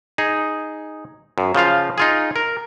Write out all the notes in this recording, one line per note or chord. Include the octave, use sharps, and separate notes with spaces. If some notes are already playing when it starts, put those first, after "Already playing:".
D#4 G#4
F#2
C#3 F3 F4 F5
D#4 F4 G#4
A#4